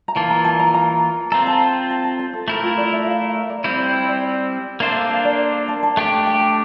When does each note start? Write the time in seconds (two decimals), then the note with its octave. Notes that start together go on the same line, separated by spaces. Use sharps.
0.08 A#5
0.15 E3 A#3 F4 A5
0.30 A#5
0.44 A5
0.59 A#5
0.74 A#5
1.32 C4 F4 A4 A#5
1.47 A5
1.90 A5
2.04 A5
2.19 C5
2.33 A4
2.48 A3 E4 G4 A#4
2.63 F4
2.77 D5
2.92 E5
3.06 F5
3.21 F5
3.35 E5
3.50 D5
3.64 G3 C4 E4 C5
3.79 C5
3.94 C5
4.04 C5
4.08 D5
4.80 A#3 D4 A4 C5 E5
4.95 F5
5.10 F5
5.25 D5
5.68 A5
5.83 A5
5.97 A3 D4 G4 G5
6.26 G5
6.41 A5